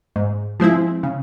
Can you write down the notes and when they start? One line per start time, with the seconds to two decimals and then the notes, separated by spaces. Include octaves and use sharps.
0.16 G#2
0.60 F3 G#3 C4 E4
1.03 C#3